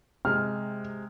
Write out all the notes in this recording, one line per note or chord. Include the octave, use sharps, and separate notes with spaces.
C3 G#3 F6